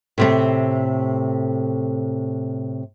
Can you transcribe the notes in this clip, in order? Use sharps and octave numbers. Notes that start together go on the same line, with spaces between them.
A2 C3 A3